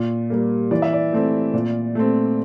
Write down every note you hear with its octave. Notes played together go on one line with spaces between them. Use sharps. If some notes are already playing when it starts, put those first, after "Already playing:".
Already playing: A#2
G3 A#3
E3 D5
E5
D5
A3 C4
A#2
A3 C4